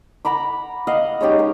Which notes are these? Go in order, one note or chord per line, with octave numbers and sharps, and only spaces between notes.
F#5 A#5 B5 D6
D#5 F5 F#5
G#3 C#4 D#4 G4
A#4